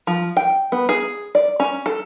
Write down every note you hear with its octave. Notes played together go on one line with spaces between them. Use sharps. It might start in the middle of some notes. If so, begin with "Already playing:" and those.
F3
G5
B3
G#4
D5
C#4
A4